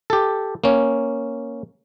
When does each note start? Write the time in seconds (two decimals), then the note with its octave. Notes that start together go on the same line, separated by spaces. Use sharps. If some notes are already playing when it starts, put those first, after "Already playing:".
0.10 G4 A4
0.64 A#3 C#4